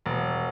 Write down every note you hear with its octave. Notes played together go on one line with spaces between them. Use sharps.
E1